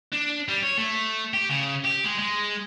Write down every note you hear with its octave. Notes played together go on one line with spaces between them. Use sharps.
D4
G3
C#5
A3
G4
C#3
G4
G#3
G#3